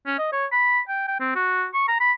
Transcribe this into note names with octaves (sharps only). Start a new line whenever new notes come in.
C#4
D#5
C#5
B5
G5
G5
C4
F#4
C#6
A#5
B5